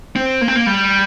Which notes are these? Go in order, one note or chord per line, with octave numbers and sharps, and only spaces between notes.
C4
A#3
C4
A#3
G3